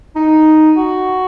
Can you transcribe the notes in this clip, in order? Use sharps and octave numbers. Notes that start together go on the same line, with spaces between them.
D#4
F#4